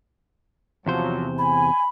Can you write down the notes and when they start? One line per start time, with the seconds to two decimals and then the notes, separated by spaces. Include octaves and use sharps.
0.87 E2 C3 F3 F#3 C5
1.38 G#5 B5